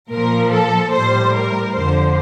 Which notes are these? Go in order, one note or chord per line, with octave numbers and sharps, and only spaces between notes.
A#2 F3 A#4
A4
A2 G3 C5
A#4
F2 D3 F3 C5